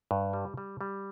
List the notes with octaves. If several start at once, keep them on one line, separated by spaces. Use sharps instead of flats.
G2
G3
G3
G3